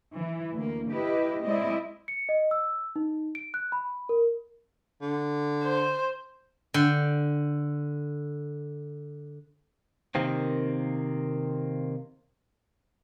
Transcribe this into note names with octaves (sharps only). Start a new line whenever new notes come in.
E3
D2 A#3
E4 G4 B4 D#5
G#3 C4 E4 D5 D#5
C#7
D#5
E6
D#4
D7
F#6
B5
A#4
D3
C5
D3 G5
C3 D#3 A#3 C4